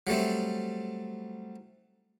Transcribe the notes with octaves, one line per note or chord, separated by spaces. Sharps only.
F#3 G3 A3 C4